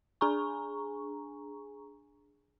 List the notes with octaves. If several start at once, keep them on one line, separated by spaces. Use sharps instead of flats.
D4 G#4 G#5 A#5 C#6